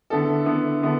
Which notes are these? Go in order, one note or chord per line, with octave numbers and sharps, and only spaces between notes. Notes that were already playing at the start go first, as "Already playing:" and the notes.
D3 B3 E4 A4
D3 B3 E4 A4
D3 B3 E4 A4